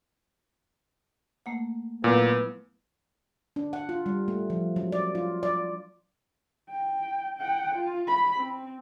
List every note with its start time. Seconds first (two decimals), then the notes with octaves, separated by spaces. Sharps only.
1.46 A3 A#3 F#5
2.04 A#2 F#3 A3 B3 E4
3.56 D4
3.73 F#5
3.89 F4
4.06 G3
4.28 A3
4.50 F3
4.76 F#3
4.92 D5
5.15 F4
5.43 D5
6.69 G5
7.38 F#5 G5
7.75 F4
8.08 B5
8.37 C4